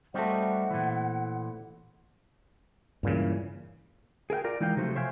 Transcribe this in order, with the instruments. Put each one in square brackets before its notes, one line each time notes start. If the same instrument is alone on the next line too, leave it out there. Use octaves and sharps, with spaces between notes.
[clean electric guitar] G3 D#4 F#4 [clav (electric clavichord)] A3 C4 [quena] F#5
[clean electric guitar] A#2 E3
[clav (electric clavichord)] C#2 A#2 C#3 [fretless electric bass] G2 E3
[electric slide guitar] G#4 A#4 F5 G5
F4 A#4 D5
E3 G#3 D#4 A#4 F5 G5
C3 F3 F#3 A3 C5
C5 C#5 E5 F5 G5 G#5